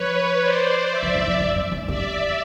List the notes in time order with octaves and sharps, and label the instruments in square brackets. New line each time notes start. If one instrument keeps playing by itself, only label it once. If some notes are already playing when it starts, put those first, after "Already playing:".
Already playing: [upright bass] F3 [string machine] B4 C#5
[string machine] C5 D5
D5 E5
[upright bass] F3
E3
F3
G3
G3
G#3
[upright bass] G3 [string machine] D5 E5